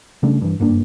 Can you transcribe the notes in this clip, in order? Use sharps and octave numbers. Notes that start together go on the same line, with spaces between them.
C#3 G3 A3 D4
G2 E3
F#1 G2 A#3 D4